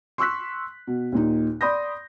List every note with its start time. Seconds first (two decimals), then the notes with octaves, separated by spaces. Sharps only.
0.18 C6 C#6 E6 F#6 B6
0.87 B2
1.12 D#2 A#2 D#4
1.61 D5 B5 C6 D#6 G6 A#6